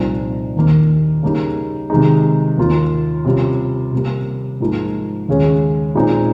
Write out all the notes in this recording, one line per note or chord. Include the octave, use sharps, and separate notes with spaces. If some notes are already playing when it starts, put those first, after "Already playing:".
Already playing: C2 A#2 F3 C4 D#4
D#2 D#3 A#3
C#3 G3 A#3 D#4
C3 D#3 G#3 D#4
D#2 D#3 A#3 F4
C3 G3 C#4 F4
C3 G3 A#3
G#2 F3 A#3 D#4
D#2 C#3 G#3 C#4
A#2 G#3 C4 D#4